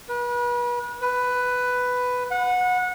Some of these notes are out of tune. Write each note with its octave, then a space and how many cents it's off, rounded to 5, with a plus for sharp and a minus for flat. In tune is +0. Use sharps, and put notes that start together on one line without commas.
B4 -35
B4 +10
F#5 -25